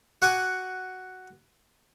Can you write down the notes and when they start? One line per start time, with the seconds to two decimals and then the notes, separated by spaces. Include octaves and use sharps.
0.22 F#4 F#5 G#5 D6